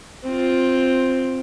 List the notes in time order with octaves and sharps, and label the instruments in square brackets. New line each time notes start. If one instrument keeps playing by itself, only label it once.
[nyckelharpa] C4 F4